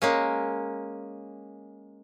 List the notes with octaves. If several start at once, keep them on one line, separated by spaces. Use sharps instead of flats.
G#3 A#3 C#4